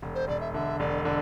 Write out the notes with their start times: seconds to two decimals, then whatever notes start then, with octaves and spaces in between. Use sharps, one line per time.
0.02 E1
0.15 C5
0.28 E1 D5
0.40 E5
0.54 D3 E5
0.80 E1 D5
1.05 D3 D5